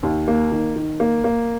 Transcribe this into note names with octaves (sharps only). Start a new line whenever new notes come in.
D#2
A#3
D#3
D#3
A#3
A#3